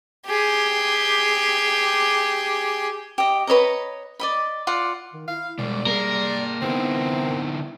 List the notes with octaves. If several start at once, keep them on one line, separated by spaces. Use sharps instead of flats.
G4 G#4
G4 D#5
B4 C#5 D#5 A#5
D5 D#5 B5
F4 D5 F#5
D#3
E4 F5
B2 G3 G#3 D5
A#3 G#4 A#4
D3 B3 C4 D#4 E4